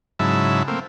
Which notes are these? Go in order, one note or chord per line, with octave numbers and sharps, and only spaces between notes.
G#2 C#3 F#3 E4 E5 A5
A3 A#3 C4